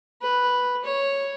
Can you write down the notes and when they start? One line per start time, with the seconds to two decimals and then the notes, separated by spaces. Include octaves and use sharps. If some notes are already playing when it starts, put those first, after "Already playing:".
0.22 B4
0.84 C#5